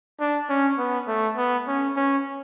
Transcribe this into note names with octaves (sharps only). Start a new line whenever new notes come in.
D4
C#4
B3
A3
B3
C#4
C#4